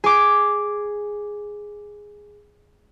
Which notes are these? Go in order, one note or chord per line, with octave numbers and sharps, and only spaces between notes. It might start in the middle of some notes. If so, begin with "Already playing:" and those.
G#4 D6